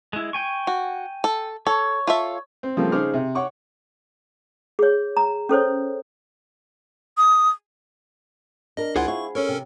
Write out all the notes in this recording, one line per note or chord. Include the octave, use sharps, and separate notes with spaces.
G#3 E4
G5 G#5 C#6
F#4
A4
A4 C#5
F4 A4 E5
C4
C#3 F3 G3 A3 A#3 C4
C#3 D#4 G#4 C5 D6 F6
C3
C#5 F#5 C#6 D6
G#4 C#5
A#5
C#4 A4 C5 C#5
D#6
D4 A#4 D#5
C#2 E4 F4 G#4 C5 F#5
E4 F4 C#6
C#4 A4 A#4 C#5
C3